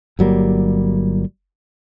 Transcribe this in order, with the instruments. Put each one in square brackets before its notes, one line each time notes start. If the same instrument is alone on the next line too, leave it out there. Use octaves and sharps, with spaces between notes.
[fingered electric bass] G1 F#3 G3 A#3